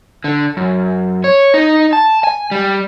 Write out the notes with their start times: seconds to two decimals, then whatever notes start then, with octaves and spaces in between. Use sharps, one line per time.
0.24 D3
0.57 F#2
1.24 C#5
1.54 D#4
1.93 A5
2.24 G#5
2.51 G3